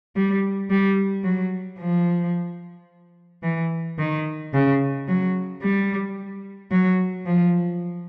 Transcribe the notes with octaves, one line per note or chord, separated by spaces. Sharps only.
G3
G3
F#3
F3
E3
D#3
C#3
F#3
G3
F#3
F3